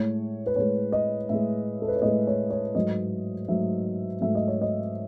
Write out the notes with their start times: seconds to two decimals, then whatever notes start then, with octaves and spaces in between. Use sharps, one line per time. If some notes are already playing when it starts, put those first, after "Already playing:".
Already playing: A2 G#3 C#5
0.46 B4
0.56 A2 G#3 C#5
0.92 D#5
1.29 A2 G#3 E5
1.82 A4
1.88 B4
1.96 C#5
2.02 A2 G#3 D#5
2.27 C#5
2.50 C#5
2.75 G#2 F#3 A3 D#5
3.48 G#2 F#3 A3 E5
4.21 G#2 F#3 A3 E5
4.35 D#5
4.48 C#5
4.61 D#5